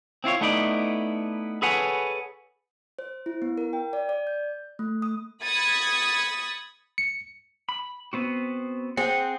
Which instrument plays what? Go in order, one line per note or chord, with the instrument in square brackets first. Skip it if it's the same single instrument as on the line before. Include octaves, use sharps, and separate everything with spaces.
[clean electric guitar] C4 E4 F4 C#5
A3 B3 D#4 E4 D5
G#4 A4 B4 C#5 F#5 G#5
[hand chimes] C5
E4
B3
A#4
G5
D5
D5
G6
A3
D#6
[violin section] B5 D#6 G#6 A6 B6 C#7
[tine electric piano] C#7
[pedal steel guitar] B5
B3 C4 F#4
[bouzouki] C4 G#4 [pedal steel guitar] F#5